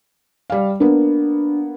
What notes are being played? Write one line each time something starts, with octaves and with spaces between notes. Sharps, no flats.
G3 F5
A#3 B3 D4